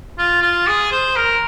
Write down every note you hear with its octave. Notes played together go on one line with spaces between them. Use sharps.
F4
F4
G#4
C5
A#4